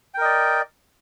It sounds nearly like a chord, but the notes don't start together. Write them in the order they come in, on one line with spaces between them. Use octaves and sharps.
G5 A#4 D#5 D5